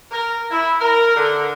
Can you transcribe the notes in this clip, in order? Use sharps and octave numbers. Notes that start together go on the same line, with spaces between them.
A#4
E4
A#4
D3